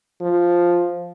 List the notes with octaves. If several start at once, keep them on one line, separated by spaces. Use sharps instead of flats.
F3